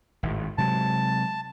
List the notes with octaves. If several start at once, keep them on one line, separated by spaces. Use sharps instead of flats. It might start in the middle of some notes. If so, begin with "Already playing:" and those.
G#1 A2
C3 F#3 G#3 A5